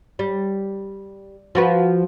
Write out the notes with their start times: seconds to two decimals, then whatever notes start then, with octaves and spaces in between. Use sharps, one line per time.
0.19 G3
1.55 F3 F#4 B4